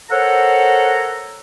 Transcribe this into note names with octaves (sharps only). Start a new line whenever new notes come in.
A4 A#4 C5 C#5 F#5 A#5